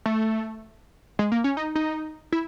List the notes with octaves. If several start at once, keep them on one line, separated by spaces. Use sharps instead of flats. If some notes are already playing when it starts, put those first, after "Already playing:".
A3
G#3
A#3
C#4
D#4
D#4
E4